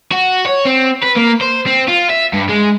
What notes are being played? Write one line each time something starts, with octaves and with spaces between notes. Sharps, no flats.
F#4
C#5
C4
B4
A#3
C5
C4
F4
E5
G2
G#3